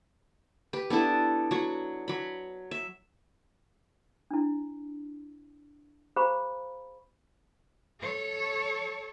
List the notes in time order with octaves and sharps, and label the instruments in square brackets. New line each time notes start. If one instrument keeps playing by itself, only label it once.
[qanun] G4 B4
B3 D4 E4 A4
F#3 F#4
F#3 B5
E5
[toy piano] D4 E4
G#4 C5 F5 A#5 B5 C#6
[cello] A4 C#5